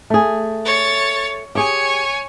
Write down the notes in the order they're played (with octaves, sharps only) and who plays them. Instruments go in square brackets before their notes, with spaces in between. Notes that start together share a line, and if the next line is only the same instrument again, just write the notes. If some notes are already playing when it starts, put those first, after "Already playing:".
[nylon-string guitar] A3 G#4
[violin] C#5 A6
[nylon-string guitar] G4 G#4 [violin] C#5 G#5